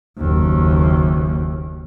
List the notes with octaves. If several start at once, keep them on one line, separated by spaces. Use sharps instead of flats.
F#1 D#2